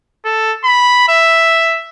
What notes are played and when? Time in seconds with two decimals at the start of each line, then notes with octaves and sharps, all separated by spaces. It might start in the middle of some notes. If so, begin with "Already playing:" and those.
0.25 A4
0.65 B5
1.08 E5